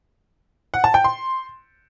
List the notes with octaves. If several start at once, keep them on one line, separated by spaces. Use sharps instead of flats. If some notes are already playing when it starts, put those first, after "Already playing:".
F#5
A5
G5
C6